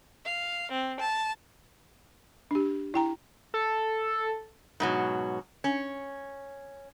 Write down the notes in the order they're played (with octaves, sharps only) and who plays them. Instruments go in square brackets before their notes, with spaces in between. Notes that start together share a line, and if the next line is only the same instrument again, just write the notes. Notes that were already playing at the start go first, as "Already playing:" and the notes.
[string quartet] F5
C4
A5
[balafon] D4 G4
E4 G5 A#5
[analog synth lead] A4
[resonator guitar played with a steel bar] G#2 B2 F#3
C#4